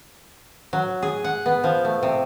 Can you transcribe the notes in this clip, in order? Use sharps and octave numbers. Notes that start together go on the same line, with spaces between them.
F#3
G#4
F#5
B3
F3
A3
C3